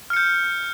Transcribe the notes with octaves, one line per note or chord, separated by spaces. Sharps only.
F6 G6 C#7